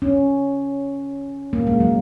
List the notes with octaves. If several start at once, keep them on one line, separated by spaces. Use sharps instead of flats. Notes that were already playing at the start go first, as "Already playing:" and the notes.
C#4
A#3
G#3
F#3